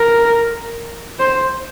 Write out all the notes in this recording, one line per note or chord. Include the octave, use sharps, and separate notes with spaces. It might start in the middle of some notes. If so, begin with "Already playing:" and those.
Already playing: A#4
C5